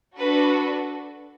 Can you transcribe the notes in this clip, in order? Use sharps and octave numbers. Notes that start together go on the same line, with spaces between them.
D4 F#4 A4 B4